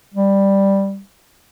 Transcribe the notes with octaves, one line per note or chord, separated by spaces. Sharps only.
G3